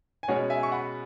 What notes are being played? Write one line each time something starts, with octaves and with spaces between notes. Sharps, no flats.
G#5
B2 G#3 C#4 C#5 F#5
E5 G#5
C#6
F#5 B5